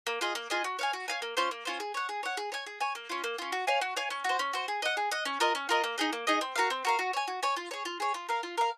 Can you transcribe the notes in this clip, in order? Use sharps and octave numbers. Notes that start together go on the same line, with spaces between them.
A#3
F4 G#4 D#5
A#3
F4 G#4 D#5
F#4
C#5 F5 G#5
F#4
C#5 F5 G#5
A#3
C#4 F4 C5
A#3
C#4 F4 C5
G#4
C#5 F#5
G#4
C#5 F#5
G#4
C#5 G#5
G#4
C#5 G#5
A#3
C#4 F4
A#3
C#4 F4
F#4
C#5 F5 G#5
F#4
C#5 F5 G#5
C#4
F#4 C5
C#4
F#4 C5
G#4
D#5 F#5
G#4
D#5 F#5
C#4
F4 A#4 D#5
C#4
F4 A#4 D#5
A#3
D#4 G#4 D#5
A#3
D#4 G#4 D#5
C4
F#4 A#4 F5
C4
F#4 A#4 F5
F#4
C#5 G#5
F#4
C#5 G#5
F4
G#4 C#5
F4
G#4 C#5
F4
A#4 F5
F4
A#4 F5